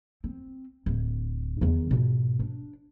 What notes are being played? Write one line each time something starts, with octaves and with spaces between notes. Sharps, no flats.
C4
D1
E2 D#3
G#2 B2
D4